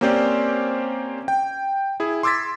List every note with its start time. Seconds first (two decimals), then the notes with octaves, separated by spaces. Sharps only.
0.01 A#3 C4 C#4 G4 C5 D5
1.28 G5
2.00 E4 G#4
2.23 C6 D6 E6 G#6 A6 B6